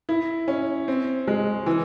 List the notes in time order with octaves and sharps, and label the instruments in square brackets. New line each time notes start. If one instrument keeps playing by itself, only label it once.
[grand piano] E4
C#4
C4
G#3
E3